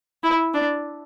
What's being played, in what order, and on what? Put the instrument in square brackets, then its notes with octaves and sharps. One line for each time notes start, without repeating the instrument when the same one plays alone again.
[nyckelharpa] E4
D4